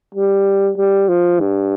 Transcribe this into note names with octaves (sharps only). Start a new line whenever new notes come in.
G3
G3
F3
G2